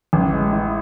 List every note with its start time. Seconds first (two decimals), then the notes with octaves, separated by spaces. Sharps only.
0.13 A1
0.33 G#3
0.52 E3